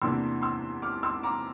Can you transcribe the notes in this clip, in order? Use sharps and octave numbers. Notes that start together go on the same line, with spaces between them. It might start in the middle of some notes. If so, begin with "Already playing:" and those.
E2 C3 E3 A#3 D4 C6 E6
C6 E6
D6 F6
C6 E6
A#5 D6